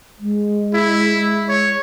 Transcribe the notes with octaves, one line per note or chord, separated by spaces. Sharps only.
G#3
E4
C#5